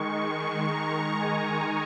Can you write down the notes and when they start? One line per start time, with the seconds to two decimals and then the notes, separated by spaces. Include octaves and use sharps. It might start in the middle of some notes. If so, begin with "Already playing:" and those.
Already playing: D#3 G#3 C#6
0.17 C#6
0.68 A#5
1.19 G#5